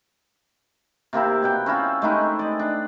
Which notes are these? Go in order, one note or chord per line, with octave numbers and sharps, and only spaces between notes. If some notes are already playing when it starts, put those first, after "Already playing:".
C3 A#3 C4 E4
B2 F#5 G5
C4 C#4 E4 F4
G#3 A3 D#4 E4
D5 D#5
D4